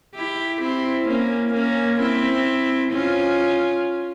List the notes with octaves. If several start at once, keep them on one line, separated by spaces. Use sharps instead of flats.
E4 G4
C4 E4
A#3 C#4
A#3 C#4
C4 E4
C#4 F4